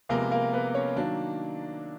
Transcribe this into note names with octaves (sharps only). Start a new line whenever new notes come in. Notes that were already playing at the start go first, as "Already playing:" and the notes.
C3 F3 G#3 A#3 B3 A#4
A#3 A#4
B3 B4
C#4 C#5
D#3 F#3 A#3 D4 D5